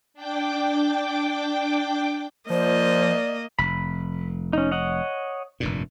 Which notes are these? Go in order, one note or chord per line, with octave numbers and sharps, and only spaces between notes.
D4 G5 D6
F3 A#3 C5 D5 D#5
F1 B5
C#4 D#4
C#5 D#5 F#5
F1 G2 A#2